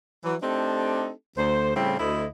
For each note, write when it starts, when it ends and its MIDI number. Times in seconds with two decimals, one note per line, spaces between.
0.24 0.35 52
0.24 0.35 54
0.43 1.11 57
0.43 1.11 60
0.43 1.11 62
0.43 1.11 63
0.43 1.11 67
0.43 1.11 69
1.38 1.75 38
1.38 1.75 72
1.75 1.97 45
1.75 1.97 49
1.75 1.97 55
1.75 1.97 60
1.75 1.97 64
1.99 2.26 38
1.99 2.26 64
1.99 2.26 75